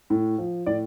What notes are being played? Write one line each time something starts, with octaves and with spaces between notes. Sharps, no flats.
A2
F3
A2 D5